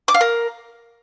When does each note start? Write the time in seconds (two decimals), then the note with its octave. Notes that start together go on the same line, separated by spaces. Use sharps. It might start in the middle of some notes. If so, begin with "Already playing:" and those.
0.08 D6
0.14 F5
0.21 A#4